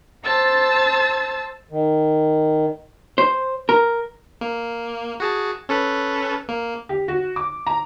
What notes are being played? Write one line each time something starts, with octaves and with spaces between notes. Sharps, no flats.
C5 A5 E6 A6
D#3
C5
A#4
A#3
F#4 G#4 A5
C#4 A4 B4
A#3
G4
F#4
D6
A#5